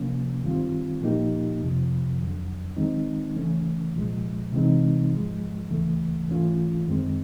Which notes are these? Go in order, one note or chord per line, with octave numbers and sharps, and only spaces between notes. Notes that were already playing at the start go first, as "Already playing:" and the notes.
Already playing: C3 F3 A#3 C#4
G2 D#3 G3 C4 F4
A#2 F3 A#3 D#4 G4
F2 C3 F3
F2 D3 F#3
D#3 G#3 C4 D#4
C#3 E3 A3 C#4
C2 A#2 F3 G#3
C3 E3 G#3 C4 D#4
G#2 F3 G#3
D2 C#3 E3 A3
G#2 E3 A3 C#4 F4
F#2 D#3 G#3 C4